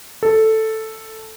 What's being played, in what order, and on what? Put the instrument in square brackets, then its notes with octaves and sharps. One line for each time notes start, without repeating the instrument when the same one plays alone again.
[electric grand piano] A4